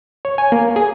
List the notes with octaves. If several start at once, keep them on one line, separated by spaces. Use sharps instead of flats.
C#5
G#5
A#3
G#4